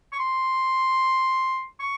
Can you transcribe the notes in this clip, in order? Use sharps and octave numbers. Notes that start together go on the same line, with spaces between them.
C#6
C6
C#6